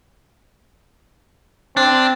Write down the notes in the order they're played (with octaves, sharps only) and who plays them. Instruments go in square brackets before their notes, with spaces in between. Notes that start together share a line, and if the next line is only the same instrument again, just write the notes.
[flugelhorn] C4 [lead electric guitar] D4